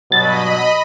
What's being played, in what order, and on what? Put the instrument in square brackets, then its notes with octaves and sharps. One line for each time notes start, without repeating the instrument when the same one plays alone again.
[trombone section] G2 B2 F#3 [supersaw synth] D#5 B5 [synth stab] A6